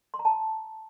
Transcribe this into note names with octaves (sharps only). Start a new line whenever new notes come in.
C6
A#5
A5